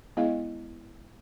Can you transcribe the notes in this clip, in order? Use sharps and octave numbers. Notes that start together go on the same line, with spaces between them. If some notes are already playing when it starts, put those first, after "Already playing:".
G#3 B3 E4 G#4 D#5 F5